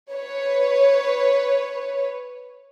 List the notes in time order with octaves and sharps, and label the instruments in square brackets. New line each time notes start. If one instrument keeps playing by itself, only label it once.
[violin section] B4 C#5